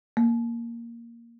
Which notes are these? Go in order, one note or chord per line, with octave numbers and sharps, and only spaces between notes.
A#3